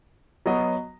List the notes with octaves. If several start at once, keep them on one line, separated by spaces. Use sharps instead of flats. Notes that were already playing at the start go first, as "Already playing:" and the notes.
F#3 B3 F#4 D#5